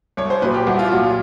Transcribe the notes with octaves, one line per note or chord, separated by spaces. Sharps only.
C2 C#5
C5
A#2 F#3 B4
G4
C2 F#4
F4
A#2 F#3 F#4
F4